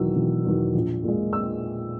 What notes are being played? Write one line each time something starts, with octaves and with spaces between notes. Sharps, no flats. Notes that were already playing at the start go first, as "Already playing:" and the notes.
Already playing: E1 E2 D#3 F#3 E6
E1
E2 D#3 F#3
A#1
A#2 G#3
E6